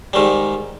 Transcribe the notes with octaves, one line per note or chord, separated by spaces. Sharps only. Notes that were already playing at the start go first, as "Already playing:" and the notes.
G#2 D#3 G3